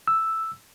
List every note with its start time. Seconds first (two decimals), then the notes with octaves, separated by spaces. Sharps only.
0.08 E6